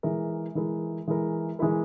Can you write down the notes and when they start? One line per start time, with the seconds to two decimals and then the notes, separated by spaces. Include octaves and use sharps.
0.03 E3 G#3 E4 A#4
0.55 E3 G#3 E4 A#4
1.07 E3 G#3 E4 A#4
1.59 E3 G#3 E4 A#4